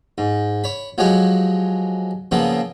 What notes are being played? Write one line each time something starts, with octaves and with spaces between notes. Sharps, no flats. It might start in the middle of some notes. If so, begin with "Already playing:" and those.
G#2
C#5 B5
F3 F#3 G#3 F#4 G4 C#5
A#2 C#3 F3 A#3 B3 E4